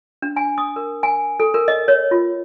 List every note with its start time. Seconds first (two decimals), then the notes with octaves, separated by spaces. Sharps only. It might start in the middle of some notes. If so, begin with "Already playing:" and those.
0.22 D4
0.36 G#5
0.58 D#6
0.76 A#4
1.03 G#5
1.40 A4
1.54 A#4
1.68 D#5
1.88 C#5
2.11 F4